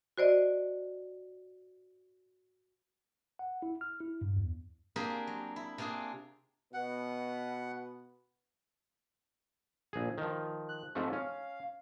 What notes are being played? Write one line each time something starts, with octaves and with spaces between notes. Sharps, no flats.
F#4 C5 D5 D#5
F#5
E4
F6
E4
G2
E2
A#3 C4 D4 G4 G#4 A#4
F#3
E4
C3 A#3 D4 F4 G#4
B2 B3 F#5
A#1 G#4
D#3 F3
F#6
G#2 F3 A3 C4
C#4 F5